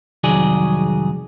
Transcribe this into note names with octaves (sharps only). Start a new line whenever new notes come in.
C2 F2 D#3 F#3 G#4 D5